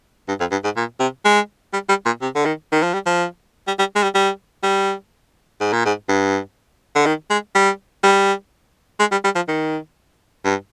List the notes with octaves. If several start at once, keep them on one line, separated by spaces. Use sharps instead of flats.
G2
F2
G2
G#2
A#2
C3
G#3
G3
G3
A#2
C3
D3
D#3
D#3
F3
G3
F3
G3
G3
G#3
G3
G3
G3
G#2
A#2
G#2
G2
D3
D#3
G#3
G3
G3
G#3
G3
G3
F3
D#3
G2